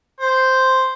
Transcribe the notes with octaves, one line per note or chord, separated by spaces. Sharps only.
C5